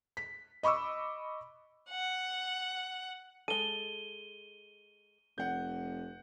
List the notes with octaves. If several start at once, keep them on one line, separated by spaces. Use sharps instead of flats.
B6
D#5 B5 C#6 D6 E6
F#5
G#3 A4 D#7 G7
F1 F#5 G6